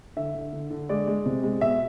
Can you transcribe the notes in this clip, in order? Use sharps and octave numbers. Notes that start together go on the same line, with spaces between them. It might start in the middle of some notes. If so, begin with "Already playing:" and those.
D3 E5
D3
D3
D3
G#3 D5
G#3
C3
G#3
B2 E5